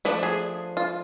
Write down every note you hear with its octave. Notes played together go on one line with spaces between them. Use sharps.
F3 A3 D4 B4
G#4
F4